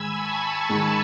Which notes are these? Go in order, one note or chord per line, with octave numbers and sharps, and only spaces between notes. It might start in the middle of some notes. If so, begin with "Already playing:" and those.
Already playing: G#2 D#3 G#3 G#5 B5 E6 G#6
A5 C#6
G#2 D#3 G#3